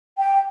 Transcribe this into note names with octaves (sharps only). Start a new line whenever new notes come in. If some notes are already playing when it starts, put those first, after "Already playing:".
G5